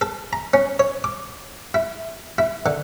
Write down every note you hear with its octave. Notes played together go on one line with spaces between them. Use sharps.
A4
A#5
C#4
C#5
D6
E4
E4
D3